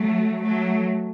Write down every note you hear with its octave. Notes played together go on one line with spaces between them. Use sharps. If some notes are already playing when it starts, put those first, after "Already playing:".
Already playing: F#3 A3
F#3 A3